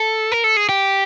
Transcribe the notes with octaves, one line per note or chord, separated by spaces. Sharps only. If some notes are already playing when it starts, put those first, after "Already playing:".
Already playing: A4
A#4
A4
G#4
G4